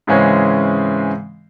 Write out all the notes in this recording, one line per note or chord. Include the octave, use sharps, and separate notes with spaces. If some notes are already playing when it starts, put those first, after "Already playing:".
G#2 C#3 E3 G#3 C4 C#4